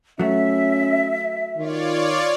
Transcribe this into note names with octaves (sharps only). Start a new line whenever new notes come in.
F#3 A3 C#4 E5
D#3 F4 C#5 D5